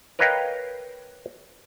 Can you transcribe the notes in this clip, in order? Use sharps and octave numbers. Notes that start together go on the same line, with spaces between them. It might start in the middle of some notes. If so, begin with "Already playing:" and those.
A#4 B4 C#5 D#5 F5 G5